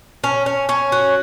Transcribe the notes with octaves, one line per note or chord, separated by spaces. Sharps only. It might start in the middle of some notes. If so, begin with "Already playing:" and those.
C#4
C#4
C#4
F#4